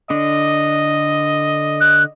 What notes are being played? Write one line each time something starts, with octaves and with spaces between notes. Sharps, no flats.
D3 D4 D#5
F#6